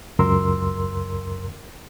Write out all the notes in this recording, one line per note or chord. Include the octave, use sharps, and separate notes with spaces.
C#2 F#2 A#4 C6 E6